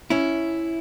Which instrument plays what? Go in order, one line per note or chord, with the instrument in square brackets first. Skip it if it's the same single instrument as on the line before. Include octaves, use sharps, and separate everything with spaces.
[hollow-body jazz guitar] C#4 E4